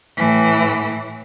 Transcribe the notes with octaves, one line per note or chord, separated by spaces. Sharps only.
A2 E3